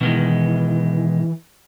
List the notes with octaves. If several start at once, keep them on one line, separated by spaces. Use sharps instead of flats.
B2 D#3 E3 G#3